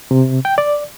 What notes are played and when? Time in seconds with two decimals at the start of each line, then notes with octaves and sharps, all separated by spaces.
0.11 C3
0.45 G5
0.58 D5